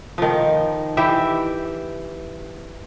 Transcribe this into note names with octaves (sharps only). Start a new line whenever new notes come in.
D#3 F3
E3 G4 E5 G5